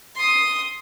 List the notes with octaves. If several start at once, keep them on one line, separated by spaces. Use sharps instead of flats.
C6 D#6